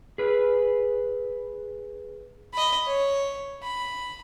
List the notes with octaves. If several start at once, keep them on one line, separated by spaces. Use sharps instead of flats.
G#4 B4
D#5 B5
C#5
B5